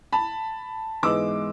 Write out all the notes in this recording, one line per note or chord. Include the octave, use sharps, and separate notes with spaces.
A5 B5
G#2 E3 G#3 B3 D6 E6